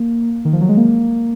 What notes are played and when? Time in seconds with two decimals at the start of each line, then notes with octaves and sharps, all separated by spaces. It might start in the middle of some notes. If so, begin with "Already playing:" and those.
Already playing: A#3
0.45 D#3
0.53 F3
0.61 F#3
0.69 G#3
0.77 A#3